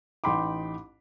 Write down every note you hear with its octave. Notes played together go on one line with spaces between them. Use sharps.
A1 D#4 G5 B5 C6 D6